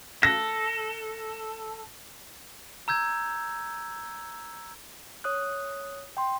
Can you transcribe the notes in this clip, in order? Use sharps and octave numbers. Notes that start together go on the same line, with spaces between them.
A4 A#6
A#5 E6 G6 G#6
C#5 D#6 F#6
G5 C6